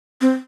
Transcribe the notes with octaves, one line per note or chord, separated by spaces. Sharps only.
C4